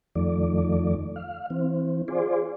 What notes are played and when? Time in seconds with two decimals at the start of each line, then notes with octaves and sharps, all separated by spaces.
0.15 F2 D#3 F3 A3 D5
1.16 F5
1.50 E3 C4
2.08 F4 G#4 C5 D5